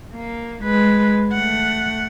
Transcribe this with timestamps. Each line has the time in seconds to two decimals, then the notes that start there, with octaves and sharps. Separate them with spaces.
0.14 A#3
0.64 G#3 B4
1.33 A3 F#5